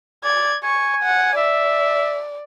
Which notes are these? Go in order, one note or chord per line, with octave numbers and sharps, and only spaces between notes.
D5 G#6
G#5 C#6
F#5
D5 E5